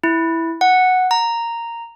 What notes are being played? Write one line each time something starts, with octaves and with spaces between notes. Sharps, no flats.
E4
F#5
A#5